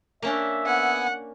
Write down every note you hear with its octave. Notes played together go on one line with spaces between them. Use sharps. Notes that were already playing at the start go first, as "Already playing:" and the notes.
A#3 C#4 D4 E5
B3 F#5 G#5